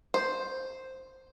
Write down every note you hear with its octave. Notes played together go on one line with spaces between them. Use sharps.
C5